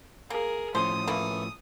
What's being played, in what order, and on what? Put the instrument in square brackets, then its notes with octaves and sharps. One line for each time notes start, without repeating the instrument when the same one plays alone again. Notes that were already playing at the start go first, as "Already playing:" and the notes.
[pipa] A#3 [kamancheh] G#4 A#4
[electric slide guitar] A2 F3 C#4 [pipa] C5 [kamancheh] D#6
[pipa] E3 A3 A#3